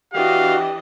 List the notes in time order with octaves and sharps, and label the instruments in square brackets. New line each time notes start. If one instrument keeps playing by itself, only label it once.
[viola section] E3 D4 D#5 [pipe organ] F#4 [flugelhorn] G4 [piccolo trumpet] F5